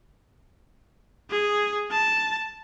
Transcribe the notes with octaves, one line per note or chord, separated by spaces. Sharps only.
G#4
A5